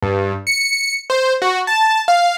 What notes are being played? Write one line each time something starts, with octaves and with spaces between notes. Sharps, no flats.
G2
C#7
C5
F#4
A5
F5